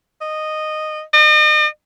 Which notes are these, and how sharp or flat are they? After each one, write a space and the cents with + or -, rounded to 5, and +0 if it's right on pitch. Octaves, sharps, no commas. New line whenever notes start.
D#5 -10
D#5 -40